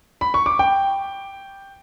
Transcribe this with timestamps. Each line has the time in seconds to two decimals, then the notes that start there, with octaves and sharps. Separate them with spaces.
0.21 B5
0.34 C#6
0.46 D6
0.59 G5